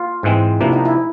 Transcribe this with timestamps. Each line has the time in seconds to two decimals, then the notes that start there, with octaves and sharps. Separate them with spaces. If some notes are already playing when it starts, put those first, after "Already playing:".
Already playing: F4
0.23 G#2 E3 G#3 C4
0.60 C3 F3 A#3 D4 E4
0.72 D#4
0.85 E4